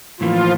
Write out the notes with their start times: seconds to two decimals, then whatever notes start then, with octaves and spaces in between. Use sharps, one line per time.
0.20 A2 E3 F3 A#3 F4